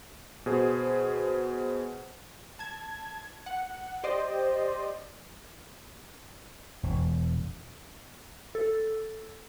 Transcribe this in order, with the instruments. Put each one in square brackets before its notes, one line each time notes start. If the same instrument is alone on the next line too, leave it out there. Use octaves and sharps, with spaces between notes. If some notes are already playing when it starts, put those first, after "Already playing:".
[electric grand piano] B2 G#4 C5
[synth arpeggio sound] A5 G#6
F#5
G4 C5 D5 D#5
[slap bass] E1
[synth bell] A4